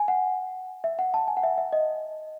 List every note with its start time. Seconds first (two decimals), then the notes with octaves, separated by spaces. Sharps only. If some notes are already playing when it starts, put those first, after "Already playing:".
Already playing: G#5
0.08 F#5
0.84 E5
0.99 F#5
1.14 A5
1.28 G#5
1.37 F#5
1.43 E5
1.58 E5
1.73 D#5